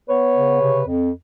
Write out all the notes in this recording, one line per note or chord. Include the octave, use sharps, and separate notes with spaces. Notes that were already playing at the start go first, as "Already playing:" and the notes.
B3 B4 C#5
C#3
C3
F2